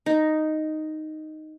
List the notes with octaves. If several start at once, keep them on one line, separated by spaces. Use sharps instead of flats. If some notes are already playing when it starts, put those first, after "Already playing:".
D#4